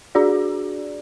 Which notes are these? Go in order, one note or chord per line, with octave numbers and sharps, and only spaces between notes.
D4 F#4 G#4 D5